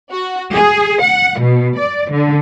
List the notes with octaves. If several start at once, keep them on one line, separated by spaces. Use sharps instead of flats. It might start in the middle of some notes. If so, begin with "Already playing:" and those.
F#4
G#4
F#5
B2
D5
D3